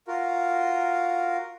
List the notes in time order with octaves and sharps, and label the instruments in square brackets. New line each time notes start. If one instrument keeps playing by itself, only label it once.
[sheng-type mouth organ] F4 F#4 A#4